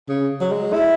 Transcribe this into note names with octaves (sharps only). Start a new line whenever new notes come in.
C#3
F#3
G#3
E4